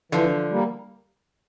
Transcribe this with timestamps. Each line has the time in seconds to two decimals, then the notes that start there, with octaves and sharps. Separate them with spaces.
0.12 D3 E3 F3
0.50 G3 A#3